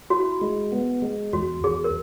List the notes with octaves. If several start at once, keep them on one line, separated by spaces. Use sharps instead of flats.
E4 F#4
G#3
B3
G#3
E2 F#4
E2 G#4
A#4